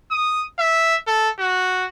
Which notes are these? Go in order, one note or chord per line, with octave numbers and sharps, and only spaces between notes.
D#6
E5
A4
F#4